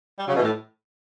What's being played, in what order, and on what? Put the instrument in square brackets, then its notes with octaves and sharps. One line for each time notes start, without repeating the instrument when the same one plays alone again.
[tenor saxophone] G3
[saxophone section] C#3 [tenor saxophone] F#3
[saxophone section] B2
[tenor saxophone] E3
[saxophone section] A2